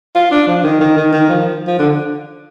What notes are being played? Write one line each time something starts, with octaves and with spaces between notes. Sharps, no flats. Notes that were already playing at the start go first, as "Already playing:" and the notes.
F4
D4
F3
D#3
D#3
D#3
D#3
F3
F3
D3